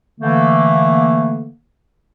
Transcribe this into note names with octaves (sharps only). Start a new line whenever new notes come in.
D3 E3 A3 A#3